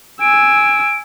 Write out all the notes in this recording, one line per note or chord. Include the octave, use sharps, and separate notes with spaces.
G#5 E6 D7